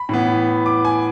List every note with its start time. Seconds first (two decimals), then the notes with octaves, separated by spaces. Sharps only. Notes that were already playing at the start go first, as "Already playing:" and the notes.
Already playing: B5
0.09 A2 E3 B3
0.66 D6
0.85 G#5